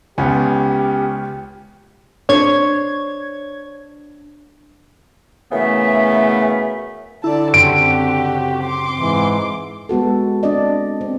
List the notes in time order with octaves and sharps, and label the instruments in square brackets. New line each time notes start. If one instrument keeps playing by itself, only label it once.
[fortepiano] C#2 [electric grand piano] B3 C#4 [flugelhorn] G4
[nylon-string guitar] D4 C5 [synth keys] C#5 G#6
[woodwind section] F#2 C#3 E3 A3 B3 E5
[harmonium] D3 [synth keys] E4 [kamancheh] D5 A5
[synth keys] F#2 C#3 C4 [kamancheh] F#4 G4 [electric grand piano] D7
[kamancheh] C6 D6
[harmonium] G#2 E3
[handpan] G#3 B3 F#4 A4
C4 D4 A4 D5 D#5
C4